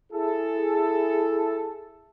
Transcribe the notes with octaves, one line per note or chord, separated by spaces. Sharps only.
E4 G#4 A4